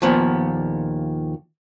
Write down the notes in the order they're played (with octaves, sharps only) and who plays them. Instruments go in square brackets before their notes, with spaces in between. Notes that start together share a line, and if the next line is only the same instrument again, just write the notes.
[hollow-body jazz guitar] D#2 A#2 F3 B3